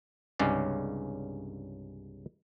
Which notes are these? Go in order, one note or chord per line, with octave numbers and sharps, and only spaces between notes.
C2 G2 C#3 G#3 C#4 D5